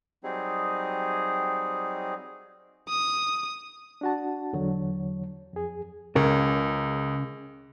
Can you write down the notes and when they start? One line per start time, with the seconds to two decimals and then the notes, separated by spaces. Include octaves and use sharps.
0.24 F#3 G3 C4 D#4 G#4
2.88 D#6
4.01 D4 F#4 A5
4.53 E2 D3 F#3 C#5
5.53 F2 G#4
6.16 C#2 C#3 A#4